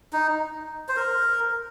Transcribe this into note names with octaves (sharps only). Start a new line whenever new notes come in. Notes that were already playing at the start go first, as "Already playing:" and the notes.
D#4
C5
A#4